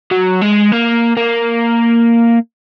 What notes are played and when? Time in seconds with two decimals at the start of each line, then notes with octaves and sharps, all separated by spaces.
0.11 F#3
0.42 G#3
0.72 A#3
1.17 A#3